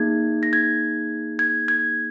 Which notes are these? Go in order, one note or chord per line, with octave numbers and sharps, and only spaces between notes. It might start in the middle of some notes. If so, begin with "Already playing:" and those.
Already playing: A#3 D#4 G#4 G#6
A#6
G#6
G#6
G#6